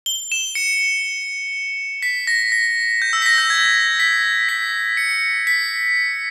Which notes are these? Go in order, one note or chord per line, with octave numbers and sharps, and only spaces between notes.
G7
E7
C#7
B6
A#6
A#6
G6
E6
B6
A#6
G6
G#6
B6
B6
C#7
B6